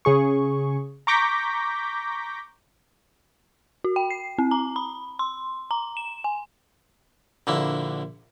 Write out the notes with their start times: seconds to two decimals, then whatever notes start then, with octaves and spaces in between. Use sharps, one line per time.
0.05 C#3 G#4 C#6
1.07 A#5 C#6 D6 G6 A#6 B6
3.84 F#4
3.96 G5
4.10 C7
4.38 C4
4.51 A#5
4.76 B5
5.19 C6
5.71 A#5
5.97 E7
6.24 G#5
7.47 A#1 D3 A#3 E4